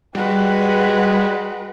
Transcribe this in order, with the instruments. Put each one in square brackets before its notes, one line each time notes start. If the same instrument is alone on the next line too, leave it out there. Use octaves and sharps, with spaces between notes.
[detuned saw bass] G3 [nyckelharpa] G#3 G#4 [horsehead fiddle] F#4 B4 [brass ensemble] G5